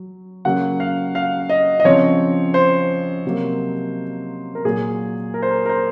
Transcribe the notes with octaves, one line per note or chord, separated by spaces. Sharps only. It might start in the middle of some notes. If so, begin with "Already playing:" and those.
Already playing: F#3
C#3 F#3 A#3 F#5
F5
F5
D#5
D#5
C#3 F3 C4 C#5
C5
C3 F#3 A#3
A#4
A#2 F#3 A#3 G#4
A#4
C5
A#4
A#4
C5